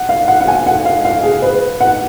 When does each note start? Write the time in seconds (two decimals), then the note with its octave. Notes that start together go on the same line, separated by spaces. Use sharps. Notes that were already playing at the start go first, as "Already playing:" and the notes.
Already playing: F#5
0.09 F5
0.28 F#5
0.41 F#5
0.48 G#5
0.66 F#5
0.85 F5
1.05 F5
1.23 G#4
1.42 B4
1.80 F#5